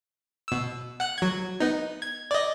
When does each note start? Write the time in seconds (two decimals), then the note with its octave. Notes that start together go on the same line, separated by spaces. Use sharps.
0.48 B2 E6
1.00 F#5 F#6
1.18 F#3 G#6
1.60 B3 D#4
2.02 G#6
2.31 D5 D#5